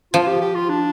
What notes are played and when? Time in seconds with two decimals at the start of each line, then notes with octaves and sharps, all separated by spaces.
0.13 F3 F4
0.27 G4
0.41 G4
0.55 F4
0.69 D4